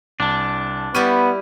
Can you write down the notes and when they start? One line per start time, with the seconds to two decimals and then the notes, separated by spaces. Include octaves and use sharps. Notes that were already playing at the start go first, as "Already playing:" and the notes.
0.20 C2 D4 A5
0.94 G3 B3 E4 G4 C#6 F6 D#7